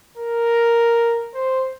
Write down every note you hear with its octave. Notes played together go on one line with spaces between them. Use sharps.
A#4
C5